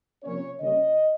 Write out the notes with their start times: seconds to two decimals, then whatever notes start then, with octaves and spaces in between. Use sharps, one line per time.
0.24 C3 F3 A#3 C#4 C#5
0.60 C#3 G3 A#3 C#4 D#5